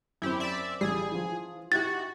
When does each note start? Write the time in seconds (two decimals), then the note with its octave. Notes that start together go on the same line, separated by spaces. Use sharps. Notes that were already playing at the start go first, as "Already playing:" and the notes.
0.22 F#2 C4 E4 G4
0.40 D5 E5
0.81 A1 G3 G#4
1.11 E3 F3
1.72 D#4 E4 F#4 G4 A6